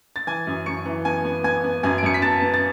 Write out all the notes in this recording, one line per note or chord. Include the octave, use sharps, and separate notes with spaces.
A6
E3 G#5 G#6
F#2
F#2 C#6 C#7
E3
B3 G#5 G#6
B3
B3 G#5 G#6
B3
F#2 G#5 G#6
D7
F#2 C#7
B6
B3 A5 A6
B3
A6